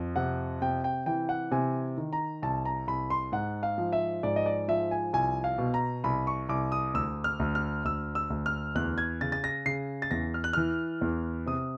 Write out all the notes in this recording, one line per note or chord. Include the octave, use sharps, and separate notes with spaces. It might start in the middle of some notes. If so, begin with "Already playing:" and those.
Already playing: F2
C3 F#5
C3 G5
G5
E3 G5
F#5
C3 G#5
D#3
A#5
C2 A5
A#5
C2 B5
C6
G#2 F#5
F5
F3
E5
G#2 D5
D#5
D5
F3 E5
G#5
C2 G#5
F5
B2
A#5
C2 B5
C#6
C2 D6
D#6
D2 E6
F6
D2
F6
D2 E6
E6
D2
F6
E2 F#6
G#6
C#3 A6
A6
A#6
C#3 C7
A6
E2 A#6
F6
F#6
E3 F6
E2
C3 D#6